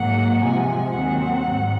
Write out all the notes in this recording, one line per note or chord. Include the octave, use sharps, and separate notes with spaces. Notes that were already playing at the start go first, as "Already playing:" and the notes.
Already playing: G#2 F#3 A#3 F#5
C3 F3 G#3 C4 G#5
D#2 D#3 F#3 C4 F#5
G#2